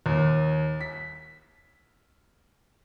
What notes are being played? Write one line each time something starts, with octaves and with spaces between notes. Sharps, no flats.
D#2
B6